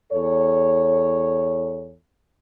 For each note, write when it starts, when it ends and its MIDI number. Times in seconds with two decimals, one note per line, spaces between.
0.13 1.93 40
0.13 1.93 69
0.13 1.93 73